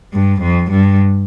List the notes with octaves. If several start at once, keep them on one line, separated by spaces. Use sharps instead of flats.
G2
F2
G2